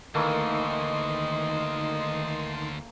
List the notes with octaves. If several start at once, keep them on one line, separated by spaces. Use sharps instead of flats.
D2 D#3 E3 A3 A#3 D#5 C6 C7